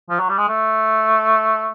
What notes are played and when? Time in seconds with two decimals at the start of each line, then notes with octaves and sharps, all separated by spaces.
0.10 F3
0.19 F#3
0.29 G3
0.38 G#3
0.49 A3